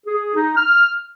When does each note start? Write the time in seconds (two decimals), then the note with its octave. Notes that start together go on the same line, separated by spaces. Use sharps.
0.07 G#4
0.35 D#4
0.57 F6